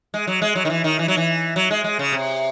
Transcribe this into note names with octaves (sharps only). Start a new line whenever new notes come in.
G#3
F#3
G#3
F#3
D#3
E3
D#3
E3
F#3
E3
F#3
G#3
G#3
C#3
C3